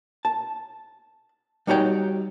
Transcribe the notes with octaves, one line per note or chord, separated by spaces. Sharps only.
A5
G3 D#4 F#4 C#5 G5